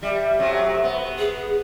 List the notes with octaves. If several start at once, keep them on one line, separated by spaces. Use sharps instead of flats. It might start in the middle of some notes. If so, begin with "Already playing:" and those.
G3 E5
C3 F#3 A3
B3
G#4